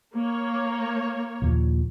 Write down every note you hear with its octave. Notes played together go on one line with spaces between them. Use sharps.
A#3 C#5
A#1 D#2 A#2